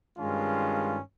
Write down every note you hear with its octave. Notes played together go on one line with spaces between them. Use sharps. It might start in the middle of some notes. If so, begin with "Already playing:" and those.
G2 D#3 G#3 C#4 F4